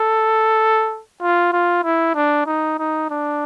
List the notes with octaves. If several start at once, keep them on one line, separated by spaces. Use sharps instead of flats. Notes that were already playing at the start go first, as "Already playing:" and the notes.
Already playing: A4
F4
F4
E4
D4
D#4
D#4
D4